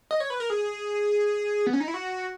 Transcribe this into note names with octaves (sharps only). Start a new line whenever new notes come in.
D#5
C#5
B4
A#4
G#4
B3
C#4
D#4
E4
F#4